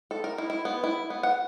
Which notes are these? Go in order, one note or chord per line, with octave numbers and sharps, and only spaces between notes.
A4
A#4
E4
E4
B3
E4
B3
F#5